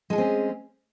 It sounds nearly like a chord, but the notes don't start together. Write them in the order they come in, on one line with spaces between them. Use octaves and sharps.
G#3 A4 G#4 C4 C#4